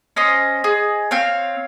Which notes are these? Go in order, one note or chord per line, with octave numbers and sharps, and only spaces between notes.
C#4 C5 D#5
G#4
C4 C#5 F5